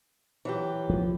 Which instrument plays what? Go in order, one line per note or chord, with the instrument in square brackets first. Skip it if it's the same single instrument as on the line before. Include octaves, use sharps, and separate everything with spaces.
[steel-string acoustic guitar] E3 F#3 G4
[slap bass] F3